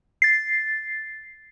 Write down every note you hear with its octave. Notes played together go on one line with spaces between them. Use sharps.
A6 C7